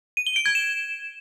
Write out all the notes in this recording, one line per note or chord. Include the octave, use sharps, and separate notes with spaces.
D#7
G7
D7
G#6
E7